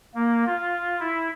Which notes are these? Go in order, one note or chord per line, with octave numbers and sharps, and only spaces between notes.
A#3
F4
E4